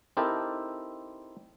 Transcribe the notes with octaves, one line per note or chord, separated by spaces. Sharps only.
C4 D#4 E4 G4 A4 A#4